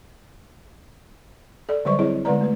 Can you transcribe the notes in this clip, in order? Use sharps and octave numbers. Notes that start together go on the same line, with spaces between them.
A4 D5
D3 F#3 G3 C5 D5 C#6
C4 E4 G#4 C#5 D#5
D3 G#3 B3 B4 D5 A#5
A3 B4